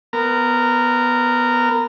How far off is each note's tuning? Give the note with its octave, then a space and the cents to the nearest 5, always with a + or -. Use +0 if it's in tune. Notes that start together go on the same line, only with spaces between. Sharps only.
B3 +0 A#4 -15